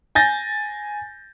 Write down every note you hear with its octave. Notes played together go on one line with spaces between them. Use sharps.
G#5 G6 A6 A#6